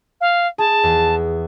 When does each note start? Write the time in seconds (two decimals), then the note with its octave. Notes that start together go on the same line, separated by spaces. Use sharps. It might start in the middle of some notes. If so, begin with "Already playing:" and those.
0.20 F5
0.58 G#4 A5
0.83 E2